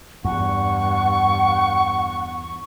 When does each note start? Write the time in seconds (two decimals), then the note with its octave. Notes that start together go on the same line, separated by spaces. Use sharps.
0.25 E2 G2 F#5 C#6